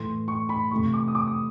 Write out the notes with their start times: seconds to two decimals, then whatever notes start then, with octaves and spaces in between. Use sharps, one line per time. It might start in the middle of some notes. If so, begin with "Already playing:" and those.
Already playing: A2 E3 A3 C6
0.28 C#6
0.49 B5
0.71 C3 E3 A3 C#6
0.93 D6
1.08 D#6
1.15 D6
1.27 D#6